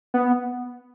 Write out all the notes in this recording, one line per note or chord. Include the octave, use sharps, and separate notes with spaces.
B3